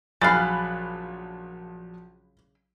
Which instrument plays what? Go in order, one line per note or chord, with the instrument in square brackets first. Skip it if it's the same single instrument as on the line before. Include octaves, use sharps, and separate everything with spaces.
[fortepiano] A#1 F#3 [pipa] C#3 F5 [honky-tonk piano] B5 F#6 A6